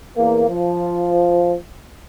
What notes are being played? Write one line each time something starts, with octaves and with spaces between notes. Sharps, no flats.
E2 A#3
F3